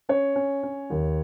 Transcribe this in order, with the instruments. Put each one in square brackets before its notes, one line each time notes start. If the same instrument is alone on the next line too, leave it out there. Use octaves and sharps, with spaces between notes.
[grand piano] C#4 C#5
C#4
C#4
D#2